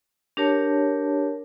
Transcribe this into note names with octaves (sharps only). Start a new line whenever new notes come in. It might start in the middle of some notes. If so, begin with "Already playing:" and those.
D4 G4 A#4 C#5 A5